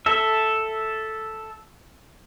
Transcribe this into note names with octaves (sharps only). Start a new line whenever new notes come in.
A4 E5